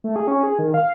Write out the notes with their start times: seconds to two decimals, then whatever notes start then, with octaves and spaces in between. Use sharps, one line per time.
0.04 A3
0.16 G#4
0.28 C#4
0.43 G#4
0.59 D#3
0.74 F5